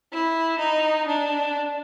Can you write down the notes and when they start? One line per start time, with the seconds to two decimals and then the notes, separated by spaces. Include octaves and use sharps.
0.12 E4
0.60 D#4
1.07 D4